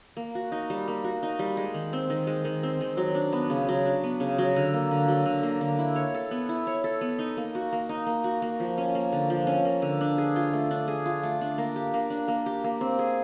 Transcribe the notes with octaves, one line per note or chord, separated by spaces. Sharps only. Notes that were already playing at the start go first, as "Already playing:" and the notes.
A#3
F#4
D#4
G3
A#3
F#4
D#4
G3
G#3
D#3
C4
D#3
G#3
D#3
C4
D#3
F#3
D4
B3
C#3
F#3
D4
B3
C#3
F#3
D3
A#3
D3
F#3
D3
A#3
D3
E4
C#5
A4
B3
E4
C#5
A4
B3
D#4
A#3
F#4
A#3
D#4
A#3
F#4
A#3
F3
C#4
A#3
D3
F3
C#4
A#3
D3
D4
G#4
F4
A3
D4
G#4
F4
A3
D4
A#3
G4
A#3
D4
A#3
G4
A#3
C4
G#4